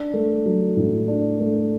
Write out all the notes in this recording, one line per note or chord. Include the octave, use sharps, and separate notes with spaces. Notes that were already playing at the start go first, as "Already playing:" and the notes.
Already playing: D4
A3
F#3
A2
D4
A3